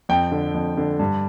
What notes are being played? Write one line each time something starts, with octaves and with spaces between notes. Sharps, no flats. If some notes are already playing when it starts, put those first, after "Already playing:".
F2 G5
D3
F2
D3
G2